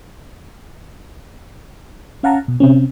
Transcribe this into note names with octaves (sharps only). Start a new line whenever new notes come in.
C#4 F5 F#5 A5 A#5
B2
C3 C4 C#4